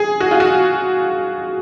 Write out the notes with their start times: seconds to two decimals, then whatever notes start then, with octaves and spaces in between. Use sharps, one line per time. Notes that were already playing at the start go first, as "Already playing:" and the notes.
Already playing: G#4
0.20 F#4
0.31 F4
0.40 F#4